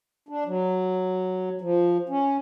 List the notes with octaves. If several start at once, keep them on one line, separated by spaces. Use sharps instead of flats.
D4
F#3
F3
C#4